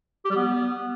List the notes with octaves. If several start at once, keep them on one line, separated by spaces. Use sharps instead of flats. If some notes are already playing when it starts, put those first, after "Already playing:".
G4
G3
B3